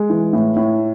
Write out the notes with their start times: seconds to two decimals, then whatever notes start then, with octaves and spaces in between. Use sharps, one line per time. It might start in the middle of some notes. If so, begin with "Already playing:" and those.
Already playing: G#3
0.10 E3
0.33 A2
0.56 A2